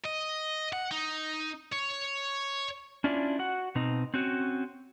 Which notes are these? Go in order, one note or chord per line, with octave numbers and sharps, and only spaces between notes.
D#5
F#5
D#4
C#5
C#4 D4 E4 F4 D5
F#4 F#5
B2 C4 D#4
C4 C#4 F#4